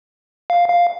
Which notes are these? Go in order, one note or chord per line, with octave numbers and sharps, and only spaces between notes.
F5
F5